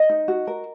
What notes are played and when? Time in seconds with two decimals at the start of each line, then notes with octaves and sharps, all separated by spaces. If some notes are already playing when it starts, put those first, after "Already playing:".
Already playing: D#5
0.09 D#4
0.28 F#4
0.47 A#4